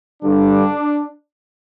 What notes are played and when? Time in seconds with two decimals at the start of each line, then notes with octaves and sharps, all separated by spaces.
0.23 G2 D3 G3 D4